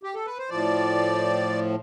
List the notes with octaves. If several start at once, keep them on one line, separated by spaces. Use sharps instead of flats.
G4
A4
B4
C5
A2 F3 D5